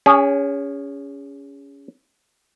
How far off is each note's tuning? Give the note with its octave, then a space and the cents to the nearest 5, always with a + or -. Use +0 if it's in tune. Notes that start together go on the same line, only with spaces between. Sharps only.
C#4 +20 G#4 -25